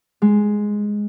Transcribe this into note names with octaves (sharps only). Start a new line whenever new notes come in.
G#3